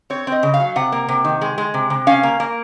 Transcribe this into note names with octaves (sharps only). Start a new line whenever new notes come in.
C4 C#5
C4 D#5
C#3
F5
F#3
C3 F#5
A#3
C3
D#3
G#3
G#3
C3
C3
C#4 F5
A#3
A#3